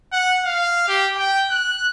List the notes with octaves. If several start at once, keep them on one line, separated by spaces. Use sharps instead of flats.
F#5
F5
G4
G5
F#6